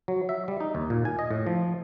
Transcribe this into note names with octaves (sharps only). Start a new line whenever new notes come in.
F#3
E5
G3
D#4
D#2
A#2
G#5
D#5
A2
F3